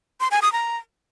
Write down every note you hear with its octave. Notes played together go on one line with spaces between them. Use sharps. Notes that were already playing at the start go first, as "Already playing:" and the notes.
C6
G#5
D#6
A#5